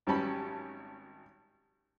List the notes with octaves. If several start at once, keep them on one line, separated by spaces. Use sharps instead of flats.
G#1 F#3 G3 C#4 A5 B5